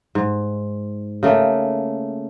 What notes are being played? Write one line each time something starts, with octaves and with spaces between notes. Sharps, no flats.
G#2
C#3 A3 A#3